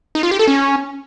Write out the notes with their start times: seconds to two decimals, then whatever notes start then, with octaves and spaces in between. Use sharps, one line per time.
0.15 D#4
0.23 F4
0.31 G4
0.39 A4
0.48 C#4